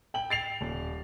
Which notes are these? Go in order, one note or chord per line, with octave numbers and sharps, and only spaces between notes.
G5 F#7
A6 C7 F7
D#1